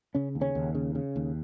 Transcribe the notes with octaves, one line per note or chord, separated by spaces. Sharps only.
C#3 C#4
D#2
C#3 C#4
D#2
C#3
C#3
D#2